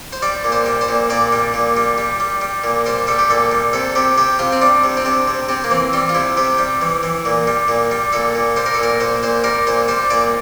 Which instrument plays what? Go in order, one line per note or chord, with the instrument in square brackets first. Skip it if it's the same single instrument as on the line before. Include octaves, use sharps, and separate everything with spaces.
[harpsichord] C5
G3 D5
A#2
C5
G3
C5
A#2
A#2 D5
G3
A#2
G3
G3
G3
G3
A#2
G3 C5
G3 A4
G4
A#2 A4
G3
C3 A4
C3 G4
C3 G4
C3 F4
C4
G3 D4
C3
C4
C3 D4
C3
C3 C4
A#3
E3 C4
G3 C4
F4
C3 E4
C3 G4
G3
E3
E3
A#2
G3
A#2
G3
A#2 A4
A#2
G3 C5
A#4
A4
A#2 A#4
A#2 C5
A#2 C5
G3 A#4
A#2 C5
G3 C5
A#2 D5